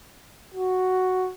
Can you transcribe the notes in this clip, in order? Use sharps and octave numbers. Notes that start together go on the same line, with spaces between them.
F#4